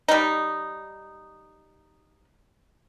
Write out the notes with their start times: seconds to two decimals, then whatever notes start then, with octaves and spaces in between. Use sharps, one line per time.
0.08 G3 D#4